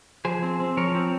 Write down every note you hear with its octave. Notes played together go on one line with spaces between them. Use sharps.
F3 G#4 C5
C4
C4
F3 A#4 C#5
C4